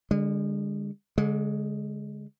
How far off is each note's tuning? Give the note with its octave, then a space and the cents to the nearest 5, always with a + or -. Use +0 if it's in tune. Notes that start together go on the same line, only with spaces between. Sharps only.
D3 +0 G#3 -35
D3 -35 G#3 +0